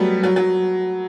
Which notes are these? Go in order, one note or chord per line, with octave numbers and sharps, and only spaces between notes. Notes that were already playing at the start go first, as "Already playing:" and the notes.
Already playing: F#3 G3 A3 B3
F#3
F#3